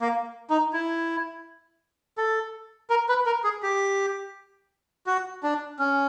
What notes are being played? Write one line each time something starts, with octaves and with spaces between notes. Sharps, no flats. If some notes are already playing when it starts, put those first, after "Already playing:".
A#3
D#4
E4
A4
A#4
B4
A#4
G#4
G4
F#4
D4
C#4